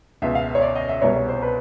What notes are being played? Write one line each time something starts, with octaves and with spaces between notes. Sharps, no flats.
C#2 B2 E5
F5
E5
C#5
D5
D#5
E5
C2 B2 C#5
C#5
C5
B4